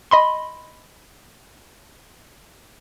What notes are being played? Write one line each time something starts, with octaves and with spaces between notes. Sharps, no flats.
D#5 B5 C6